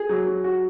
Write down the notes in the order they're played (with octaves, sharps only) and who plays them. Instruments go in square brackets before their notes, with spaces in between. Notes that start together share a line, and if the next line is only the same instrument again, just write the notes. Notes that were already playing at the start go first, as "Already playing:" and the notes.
Already playing: [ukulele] G#4
[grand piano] F#3
F#3
F#4